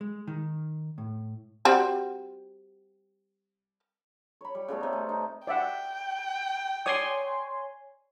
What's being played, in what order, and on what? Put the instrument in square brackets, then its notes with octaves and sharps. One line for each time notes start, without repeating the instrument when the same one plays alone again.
[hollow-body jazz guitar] G#3
D#3
A2
[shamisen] G3 C4 F#4
[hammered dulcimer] C#5 B5
G3
C#3 G3 A3 B3
C3 D#4
A5
D#4
[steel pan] D5 E5 F#5 [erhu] G5
[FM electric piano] C#5 G#5 C6 [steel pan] D5 D#6